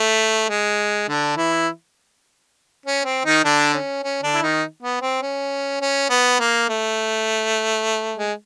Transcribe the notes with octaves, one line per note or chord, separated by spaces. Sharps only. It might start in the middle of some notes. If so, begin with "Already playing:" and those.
Already playing: A3
G#3
D3 D4
E3 E4
C#4
C4
D#3 D#4
D3 D4
C#4
C#4
D3 D4
E4
D#3 D#4
B3
C4
C#4
C#4
B3
A#3
A3
G#3